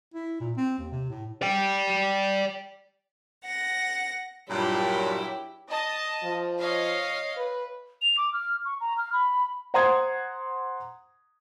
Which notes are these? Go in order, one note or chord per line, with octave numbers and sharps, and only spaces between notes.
E4
A#2
C4
D#2
C3
A2
D5 G5
F#5 A#6
G2 A#2 F#3 G3 E4 G4 C#5
D#5 A5
F3
C#5 D#5 F5
B4
F7
D6
F6
C#6
A#5
F6
B5
C5 F#5 A#5 C6 D#6 G#6